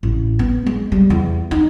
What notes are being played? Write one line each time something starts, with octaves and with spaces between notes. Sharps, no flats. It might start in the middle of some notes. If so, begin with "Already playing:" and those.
A1
B3
G#3
G3
E2
D#4